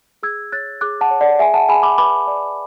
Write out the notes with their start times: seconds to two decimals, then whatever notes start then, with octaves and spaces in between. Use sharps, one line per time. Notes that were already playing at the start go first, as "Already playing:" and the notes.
0.23 G#4 E6 G#6
0.52 C#5 F#6 A6
0.81 G#4 D6 F#6
1.01 F#5 A5
1.11 C#5
1.21 D5 F#5
1.39 G#4 E5 G#5
1.54 F#5 A5
1.69 G#4 G#5 B5
1.83 B5 D6
1.98 B4 B5 D6
2.27 D5